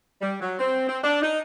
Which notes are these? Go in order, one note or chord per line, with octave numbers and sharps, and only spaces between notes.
G3
F#3
C4
C4
D4
D#4